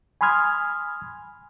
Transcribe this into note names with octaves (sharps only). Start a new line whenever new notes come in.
G#5 B5 C6 D#6 F6 G#6